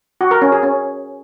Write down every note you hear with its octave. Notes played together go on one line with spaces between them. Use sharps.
F#4
A#4
C#4
G#4
C#4